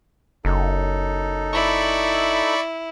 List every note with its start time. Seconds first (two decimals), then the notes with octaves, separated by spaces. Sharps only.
0.45 F#1 D#4 A4
1.53 E4 D5 B5 C#6